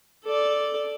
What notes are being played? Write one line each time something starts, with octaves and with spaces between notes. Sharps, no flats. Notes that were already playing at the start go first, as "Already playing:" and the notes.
A4 D5